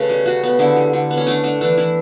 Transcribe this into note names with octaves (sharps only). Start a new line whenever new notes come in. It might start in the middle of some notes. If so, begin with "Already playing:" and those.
Already playing: C#3 A3 B4
G3
C#3 F#4
B3
D3 E4
G3
D3
B3
C#4
A3 D4
A3 D4
E3 D4
E3 E4